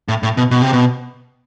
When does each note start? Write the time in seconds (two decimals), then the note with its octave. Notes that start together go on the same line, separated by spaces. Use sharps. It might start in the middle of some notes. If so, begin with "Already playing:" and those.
0.08 A2
0.23 A2
0.37 B2
0.51 B2
0.62 C3
0.73 B2